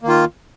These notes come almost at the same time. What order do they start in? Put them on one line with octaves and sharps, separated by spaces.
A#3 D#3 F4